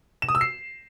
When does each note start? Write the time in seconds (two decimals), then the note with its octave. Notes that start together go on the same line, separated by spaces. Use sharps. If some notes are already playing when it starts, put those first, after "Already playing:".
0.22 E7
0.29 D#6
0.35 E6
0.41 C7